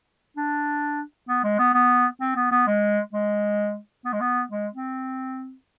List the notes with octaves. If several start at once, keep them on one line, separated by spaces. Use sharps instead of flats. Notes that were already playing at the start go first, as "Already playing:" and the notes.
D4
B3
G#3
B3
B3
C4
B3
B3
G#3
G#3
B3
G#3
B3
G#3
C4